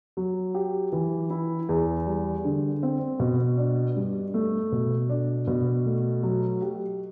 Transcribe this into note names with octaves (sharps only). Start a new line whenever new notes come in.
F#3
G4
E3
E4
E2
G3
D3
C4
B2
D4
G2
A3
B2
D4
B2
A3
F#3
G4